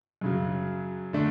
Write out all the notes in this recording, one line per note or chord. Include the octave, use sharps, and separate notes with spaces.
F#2 C#3 F#3
D3 A3 D4